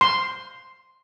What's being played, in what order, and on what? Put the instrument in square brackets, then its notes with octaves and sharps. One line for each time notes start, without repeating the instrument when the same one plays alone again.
[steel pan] C6